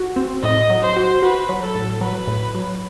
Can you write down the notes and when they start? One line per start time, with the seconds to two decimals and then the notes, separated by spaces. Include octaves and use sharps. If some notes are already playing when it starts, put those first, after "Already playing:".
Already playing: F#4
0.16 C4
0.43 A2 D#5
0.70 F#3
0.82 C5
0.96 F#4
1.22 F#4 B4
1.49 F#3
1.63 A4
1.75 A2
2.01 F#3 B4
2.27 A2
2.55 F#3